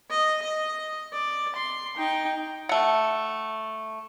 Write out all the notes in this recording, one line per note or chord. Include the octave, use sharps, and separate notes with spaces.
D#5
D#5
D5
C6
D#4 G5
A3 F#5